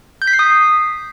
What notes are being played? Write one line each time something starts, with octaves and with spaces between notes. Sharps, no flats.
G6
B6
C7
D#6